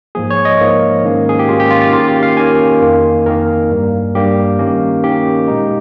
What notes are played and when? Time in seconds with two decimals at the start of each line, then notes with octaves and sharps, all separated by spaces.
0.15 G#2 F3 A#3 G#4
0.30 C#5
0.45 D#5
0.60 G#2 F3 A#3
1.04 G#2 D#3 A#3 C#4
1.29 G#4
1.39 G4
1.49 G#2 D#3 A#3 C#4 F4
1.60 G4
1.71 F4
1.82 F4
1.93 D#3 A#3 C#4 F4
2.08 G4
2.23 F5
2.37 D#3 A#3 C#4 G#5
2.82 F2 D#3 A#3
3.26 F2 D#3 A#3 A#4
3.70 G2 G3 A#3
4.15 G2 G3 A#3 G4
4.59 D#3 A#3 C#4
5.04 D#3 A#3 C#4 G4
5.48 A#2 G#3 D#4